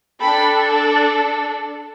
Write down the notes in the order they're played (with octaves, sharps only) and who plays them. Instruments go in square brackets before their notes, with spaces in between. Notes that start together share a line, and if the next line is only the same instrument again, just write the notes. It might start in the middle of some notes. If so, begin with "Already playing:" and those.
[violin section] D4 A4 G5 B5